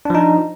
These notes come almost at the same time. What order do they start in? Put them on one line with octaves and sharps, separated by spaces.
D4 F3 D#4